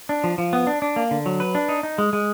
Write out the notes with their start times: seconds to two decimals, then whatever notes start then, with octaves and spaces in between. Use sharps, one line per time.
0.09 D4
0.24 F3
0.38 F3
0.53 B3
0.67 D4
0.82 D4
0.96 A#3
1.11 D3
1.26 F#3
1.40 B4
1.55 D4
1.69 D#4
1.83 D#4
1.98 G#3
2.13 G#3